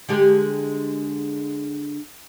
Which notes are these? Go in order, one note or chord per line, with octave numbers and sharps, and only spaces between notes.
D3 G#3 G4